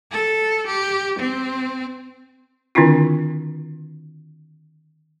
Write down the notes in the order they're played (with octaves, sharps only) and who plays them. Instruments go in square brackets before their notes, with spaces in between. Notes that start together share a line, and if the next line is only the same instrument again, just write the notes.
[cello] A4
G4
C4
[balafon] D3 D#3 C4 D4 E4 F4